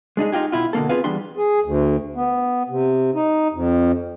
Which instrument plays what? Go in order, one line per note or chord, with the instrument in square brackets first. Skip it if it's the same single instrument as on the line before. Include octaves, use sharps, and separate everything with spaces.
[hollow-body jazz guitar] G#3 D4 D#4 G#4
D#4 F4 G4 G#4
B2 E4 F4
B2 D3 A#3 A4
B3 C4 F4 G#4 B4 F5
E2 G3 D4 C6
[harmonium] G#4
D2
B3
C3
D#4
F2